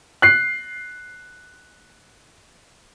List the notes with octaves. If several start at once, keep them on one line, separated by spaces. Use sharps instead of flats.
F#6 C7